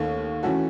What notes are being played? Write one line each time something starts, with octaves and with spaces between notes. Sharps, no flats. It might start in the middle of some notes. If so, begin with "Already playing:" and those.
Already playing: D#2 D#3 A3
E3 A3 C#4 F#4 A4